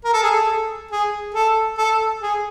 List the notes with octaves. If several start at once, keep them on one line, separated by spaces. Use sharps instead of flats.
A#4
A4
G#4
A4
G#4
A4
A4
G#4